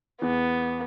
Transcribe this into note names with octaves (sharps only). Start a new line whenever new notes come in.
E2 B3